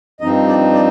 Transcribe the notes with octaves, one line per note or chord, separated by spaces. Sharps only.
G2 F3 C4 D#4 D#5
D5
D5